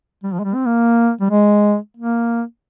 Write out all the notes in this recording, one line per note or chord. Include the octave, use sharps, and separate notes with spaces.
G3
F3
G#3
G3
C4
A#3
G3
G#3
A#3